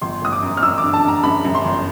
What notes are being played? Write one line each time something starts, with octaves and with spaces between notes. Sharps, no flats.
G1 C6
G1 D#6
D6
F#2
F6
F#2 E6
D6
D3
A5
D3 A#5
F#2 B5
F#2
C6
G1